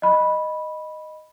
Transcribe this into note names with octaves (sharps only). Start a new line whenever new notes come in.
D#5 B5